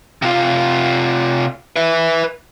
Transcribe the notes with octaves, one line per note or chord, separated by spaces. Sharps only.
C3 F4
B4 E5